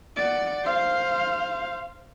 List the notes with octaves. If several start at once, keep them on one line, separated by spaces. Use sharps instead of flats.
D5 F#5
C5 F5